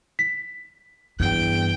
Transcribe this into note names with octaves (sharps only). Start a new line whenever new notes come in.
B6
E2 G2 G5